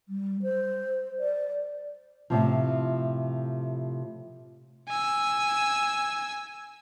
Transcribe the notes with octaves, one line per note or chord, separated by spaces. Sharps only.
G3
C5
D5
A2 C3 F3
G#5 E6